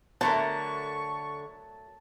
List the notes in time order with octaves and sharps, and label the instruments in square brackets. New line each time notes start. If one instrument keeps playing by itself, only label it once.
[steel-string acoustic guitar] D3 [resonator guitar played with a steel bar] F#3 A3 A#4 [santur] A5 [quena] C#6